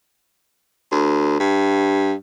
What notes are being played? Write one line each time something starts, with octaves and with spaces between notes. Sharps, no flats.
D2
G2